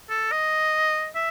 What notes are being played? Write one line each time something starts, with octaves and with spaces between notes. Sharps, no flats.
A4
D#5
E5